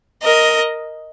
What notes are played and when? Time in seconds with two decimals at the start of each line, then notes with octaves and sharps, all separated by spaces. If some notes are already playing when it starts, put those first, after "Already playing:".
0.23 A#4 D#5